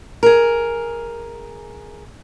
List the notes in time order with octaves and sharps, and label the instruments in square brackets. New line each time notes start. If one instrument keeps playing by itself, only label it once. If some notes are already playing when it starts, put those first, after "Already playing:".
[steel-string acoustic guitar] G#4 A#4